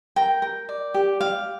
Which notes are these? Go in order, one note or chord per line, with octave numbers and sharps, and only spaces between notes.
A#4 G5
A#4
D5
G4
G4 F5